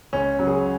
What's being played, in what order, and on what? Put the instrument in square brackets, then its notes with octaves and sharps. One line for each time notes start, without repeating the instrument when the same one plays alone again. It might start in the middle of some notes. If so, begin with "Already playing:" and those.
[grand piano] C#2 C#4
C#3 F#3
G#4